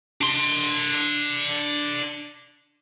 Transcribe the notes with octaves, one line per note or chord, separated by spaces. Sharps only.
D4 C6